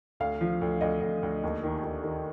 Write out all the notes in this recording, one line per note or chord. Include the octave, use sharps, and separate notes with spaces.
D2 F5
F3
D2
D2 D#5
D2
D2
D#2
D#3
D#3
D#3